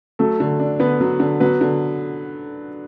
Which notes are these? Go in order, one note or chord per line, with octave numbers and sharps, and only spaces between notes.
F#3 A3 A4
D3
D4
D3 B3 B4
F#3
D3
F#3 B3 B4
D3